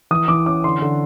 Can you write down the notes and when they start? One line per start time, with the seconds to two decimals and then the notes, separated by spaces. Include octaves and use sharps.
0.11 E3 D#6
0.28 E3 D6
0.46 C#4 D6
0.64 D3 C6
0.82 D3